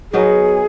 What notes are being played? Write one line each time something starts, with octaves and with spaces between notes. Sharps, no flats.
F#3 B3 D#4 G#4 A#4